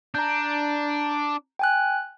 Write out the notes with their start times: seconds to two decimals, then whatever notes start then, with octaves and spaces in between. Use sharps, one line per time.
0.14 D4 A#5 G6
1.59 G5 G#5 F#6